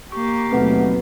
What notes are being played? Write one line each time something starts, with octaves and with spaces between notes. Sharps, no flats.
A#3 G4 C#6
D#2 B2 F#3 A3 B3 C4 B4 F#5